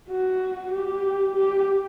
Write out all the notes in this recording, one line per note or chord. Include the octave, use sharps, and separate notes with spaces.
F#4
G4
G4